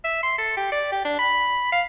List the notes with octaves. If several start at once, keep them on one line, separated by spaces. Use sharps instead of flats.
E5
C6
A4
G4
D5
G4
D4
B5
F5